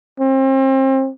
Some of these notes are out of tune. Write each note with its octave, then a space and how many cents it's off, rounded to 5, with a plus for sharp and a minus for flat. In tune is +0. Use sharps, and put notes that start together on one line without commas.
C4 +35